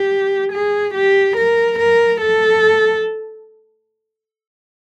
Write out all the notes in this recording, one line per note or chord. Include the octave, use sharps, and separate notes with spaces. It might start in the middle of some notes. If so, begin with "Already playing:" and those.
Already playing: G4
G#4
G4
A#4
A#4
A4